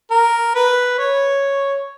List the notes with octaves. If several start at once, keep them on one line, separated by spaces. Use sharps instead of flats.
A#4
B4
C#5